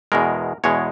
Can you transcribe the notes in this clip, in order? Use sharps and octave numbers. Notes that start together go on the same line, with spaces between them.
E2 B2 G#3 A#4
E2 B2 G#3 C#5